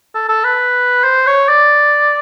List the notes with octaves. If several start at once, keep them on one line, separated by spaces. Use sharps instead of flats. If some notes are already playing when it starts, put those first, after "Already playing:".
A4
A4
B4
C5
C#5
D5